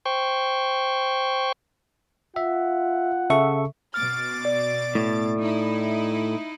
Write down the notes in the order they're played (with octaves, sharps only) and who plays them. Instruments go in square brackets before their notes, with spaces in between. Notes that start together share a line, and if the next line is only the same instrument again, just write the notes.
[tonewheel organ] C5 G5 C#6
[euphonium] F4 [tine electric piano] E5 [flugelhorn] F#5
[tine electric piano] C#3 A4 C#6 [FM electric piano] E5
[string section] B2 D6 A6 [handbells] F6
[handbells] D5
[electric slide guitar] A2
[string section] D#4 E4